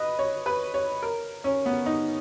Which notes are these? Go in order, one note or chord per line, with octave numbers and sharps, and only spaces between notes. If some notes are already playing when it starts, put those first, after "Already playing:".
Already playing: B4 D#5
C#5
B4
C#5
A#4
C#4
B3
D#4